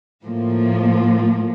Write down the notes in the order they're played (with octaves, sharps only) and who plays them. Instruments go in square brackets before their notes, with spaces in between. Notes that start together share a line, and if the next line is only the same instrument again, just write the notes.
[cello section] A2 F3 A#3